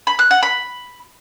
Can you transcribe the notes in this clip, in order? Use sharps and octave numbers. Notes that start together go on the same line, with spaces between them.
B5
F#6
F#5
B5